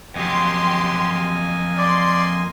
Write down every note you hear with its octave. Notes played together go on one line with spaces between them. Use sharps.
F2 F#3 A#3 G4 D#5 G#5 C6
D5 C6